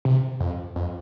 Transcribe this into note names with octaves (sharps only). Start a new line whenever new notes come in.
C3
F2
F2